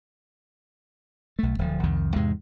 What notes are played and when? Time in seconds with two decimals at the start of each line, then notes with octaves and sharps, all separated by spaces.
1.39 B1 A3
1.59 D1 F3
1.83 C2 F2 D#3
2.16 E2 G#2 C3 G#3